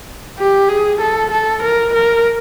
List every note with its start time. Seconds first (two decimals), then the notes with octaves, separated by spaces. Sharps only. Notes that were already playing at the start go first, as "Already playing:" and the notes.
0.38 G4
0.68 G#4
1.00 A4
1.31 A4
1.62 A#4
1.93 A#4